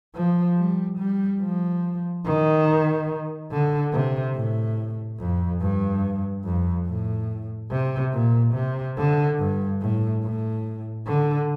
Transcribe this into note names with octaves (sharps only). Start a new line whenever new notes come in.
F3
G3
G3
F3
D#3
D3
C3
A2
F2
G2
F2
A2
C3
A#2
C3
D3
G2
A2
A2
D3